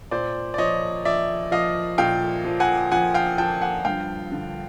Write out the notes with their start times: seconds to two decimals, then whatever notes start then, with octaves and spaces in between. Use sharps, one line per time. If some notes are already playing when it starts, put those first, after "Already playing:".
0.11 A#2 C5 D5
0.54 D5
0.58 F3 C#5 D#5
1.05 F3 D5 E5
1.51 F3 D#5 F5
1.98 A#2 F5 G5
2.45 F3
2.60 F#5 G#5
2.92 F3 F#5 G#5
3.14 F5 G5
3.38 F3 G5 A5
3.61 F#5 G#5
3.85 G2 F5 G5
4.32 D3